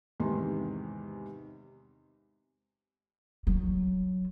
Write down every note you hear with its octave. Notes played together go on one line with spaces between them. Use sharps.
E2 G#2 C3 D#3 C6
F#3